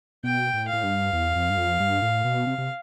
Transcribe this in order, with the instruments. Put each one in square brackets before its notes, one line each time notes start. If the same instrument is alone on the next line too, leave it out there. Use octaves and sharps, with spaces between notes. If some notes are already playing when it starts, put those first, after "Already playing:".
[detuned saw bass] B2 [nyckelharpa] G5
[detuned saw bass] A2
[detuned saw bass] A2 [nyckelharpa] F5
[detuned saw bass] G2
E2
F2
G2
F2
G2
A2
B2
C3
C3